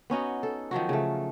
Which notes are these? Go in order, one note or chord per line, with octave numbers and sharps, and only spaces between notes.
B3 C#4 D#4 F#4
A4
D#3 F3 F#3 F#4
C#3 A3